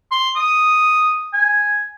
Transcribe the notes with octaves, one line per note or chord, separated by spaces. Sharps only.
C6
D#6
G#5